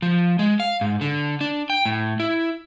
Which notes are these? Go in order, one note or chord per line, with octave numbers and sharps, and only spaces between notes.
F3
G#3
F5
G#2
D3
D4
G5
A2
E4